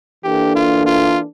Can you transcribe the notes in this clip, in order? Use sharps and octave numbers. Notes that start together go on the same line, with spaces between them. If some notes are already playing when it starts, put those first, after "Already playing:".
E3 A#3 D4 G4 A4
F4
F4